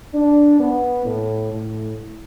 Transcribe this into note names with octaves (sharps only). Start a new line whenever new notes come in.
D4
B3
A2
A2